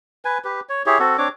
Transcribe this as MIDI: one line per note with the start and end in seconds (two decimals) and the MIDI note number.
0.25 0.38 71
0.25 0.38 80
0.44 0.60 67
0.44 0.60 71
0.69 0.83 73
0.86 0.98 64
0.86 0.98 67
0.86 0.98 68
0.86 0.98 73
0.99 1.17 60
0.99 1.17 66
0.99 1.17 69
1.18 1.28 60
1.18 1.28 62
1.18 1.28 73
1.18 1.28 86